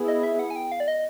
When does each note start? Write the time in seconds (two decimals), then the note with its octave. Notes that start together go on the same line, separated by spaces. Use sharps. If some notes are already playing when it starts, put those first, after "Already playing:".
Already playing: B3 E4 G#4
0.08 D#5
0.23 E5
0.39 F#5
0.50 G#5
0.56 G5
0.72 F5
0.80 D5
0.88 D#5